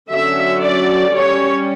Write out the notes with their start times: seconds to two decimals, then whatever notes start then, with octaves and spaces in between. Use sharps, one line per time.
0.11 D3 F#3 C#4 E5
0.62 D5
1.13 G3 C#4 C#5